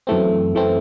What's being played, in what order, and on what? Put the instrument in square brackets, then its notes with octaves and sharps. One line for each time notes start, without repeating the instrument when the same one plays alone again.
[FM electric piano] F#2 E3 A3 C4
F#2 E3 A3 C4